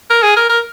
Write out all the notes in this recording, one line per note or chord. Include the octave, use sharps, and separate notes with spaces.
A#4
G#4
A#4
A#4